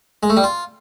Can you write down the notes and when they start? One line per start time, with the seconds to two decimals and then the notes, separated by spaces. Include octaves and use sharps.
0.23 G#3
0.30 A3
0.37 G3
0.44 F4